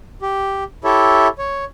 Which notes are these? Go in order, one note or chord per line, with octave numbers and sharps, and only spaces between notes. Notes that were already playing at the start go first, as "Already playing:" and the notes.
G4
E4 G4 A4 C#5 E5
C#5